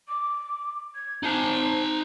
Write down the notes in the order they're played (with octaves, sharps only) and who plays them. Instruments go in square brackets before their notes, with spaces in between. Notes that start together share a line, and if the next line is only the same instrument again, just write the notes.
[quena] D6
G#6
[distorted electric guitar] D#4 A5 [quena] C5